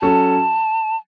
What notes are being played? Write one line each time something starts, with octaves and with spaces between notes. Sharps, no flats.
F#3 C#4 F#4 A4 A5